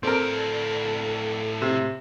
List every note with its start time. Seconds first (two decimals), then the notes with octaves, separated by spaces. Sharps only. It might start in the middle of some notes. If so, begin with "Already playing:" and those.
0.03 A2 C4 A4 A#4 D5
1.62 C3